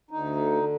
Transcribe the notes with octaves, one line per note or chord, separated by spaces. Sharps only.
D2 D#4
D3